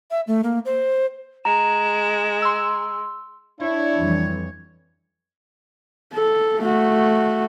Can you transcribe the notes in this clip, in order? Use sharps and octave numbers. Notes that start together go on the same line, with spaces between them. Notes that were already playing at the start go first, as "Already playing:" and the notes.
E5
A3
A#3
C5
G#3 A#5 E7
C6 E6
D4 E4 C#5
F2 E3 G3
A4
A3 F#4